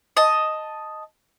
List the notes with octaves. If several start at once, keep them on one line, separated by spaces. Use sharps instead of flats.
D#5 A5